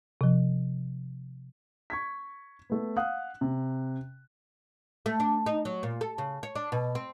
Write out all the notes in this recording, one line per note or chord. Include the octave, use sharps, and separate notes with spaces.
C3 F3
C#6 G#6 B6
A3 B3
F5 F#5 D#6 F#6
C3
A3
D4
D#4
F#3
A#2
A4
C#3
C#5
D4
B2
C4